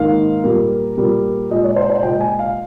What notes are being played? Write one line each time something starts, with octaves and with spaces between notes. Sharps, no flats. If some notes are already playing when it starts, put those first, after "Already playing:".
Already playing: G#2 D#3 A#3 F5
A#2 G3 A#3
A#2 G3 A#3
A#2 G#3 D#5
C#5
C5
C5
A#2 G#3 G5
G#5
F5